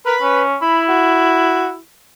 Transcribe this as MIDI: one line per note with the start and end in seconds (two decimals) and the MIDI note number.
0.06 0.15 70
0.06 0.41 71
0.06 0.41 83
0.21 0.57 61
0.62 1.79 64
0.62 0.85 83
0.89 1.73 66